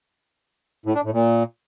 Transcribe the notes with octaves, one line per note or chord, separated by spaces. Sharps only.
A2
D4
A2
A#2